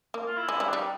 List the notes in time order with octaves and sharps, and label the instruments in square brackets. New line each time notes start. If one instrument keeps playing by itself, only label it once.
[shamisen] A#3
[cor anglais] F4
E4
[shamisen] G#3
G3
[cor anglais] D4
[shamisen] G3
[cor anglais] D#4